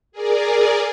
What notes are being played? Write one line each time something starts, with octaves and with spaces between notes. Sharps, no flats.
G#4 A#4 D5